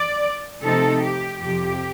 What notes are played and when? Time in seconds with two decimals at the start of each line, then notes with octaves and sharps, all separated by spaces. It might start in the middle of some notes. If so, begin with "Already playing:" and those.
Already playing: D5
0.63 C3 F3 A3 C4 D#4 A4
1.03 G4
1.43 F2 C3 F3 G4